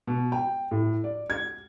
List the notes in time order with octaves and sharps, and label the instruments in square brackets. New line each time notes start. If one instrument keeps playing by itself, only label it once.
[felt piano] B2
G5
A2
D5
G#6